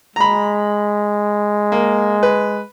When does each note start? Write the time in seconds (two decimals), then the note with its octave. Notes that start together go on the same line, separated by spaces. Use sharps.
0.16 G#3 A#5 B5
1.72 A#3
2.23 B4